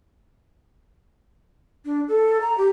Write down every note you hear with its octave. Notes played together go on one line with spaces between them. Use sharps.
D4
A4
A#5
G4